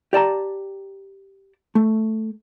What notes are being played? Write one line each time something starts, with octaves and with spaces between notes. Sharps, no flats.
G4 D5 A5 A#5
A3